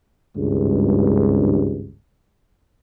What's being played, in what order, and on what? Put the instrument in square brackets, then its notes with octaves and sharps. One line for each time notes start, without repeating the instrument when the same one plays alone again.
[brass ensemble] G#1 C#2 G2